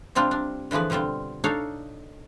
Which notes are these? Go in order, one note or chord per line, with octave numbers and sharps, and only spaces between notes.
C3 G3 C4 D4 F4
C3 D4
D3 E3 F3 G#4 B4
B2 D3 G3 C4 F4
D4 D#4 A4 C#5 F5